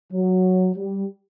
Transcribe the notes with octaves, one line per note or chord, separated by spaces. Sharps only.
F#3
G3